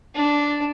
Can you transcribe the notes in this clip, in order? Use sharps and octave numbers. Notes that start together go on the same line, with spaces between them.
D4